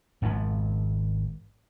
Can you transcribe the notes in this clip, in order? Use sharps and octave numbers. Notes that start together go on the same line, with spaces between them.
G#1 G#2 D3 F3